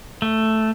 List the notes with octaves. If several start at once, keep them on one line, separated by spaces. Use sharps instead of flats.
A3